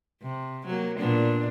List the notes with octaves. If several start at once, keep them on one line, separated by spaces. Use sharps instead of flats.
C3
F#3 A#3
A#2 B3 D4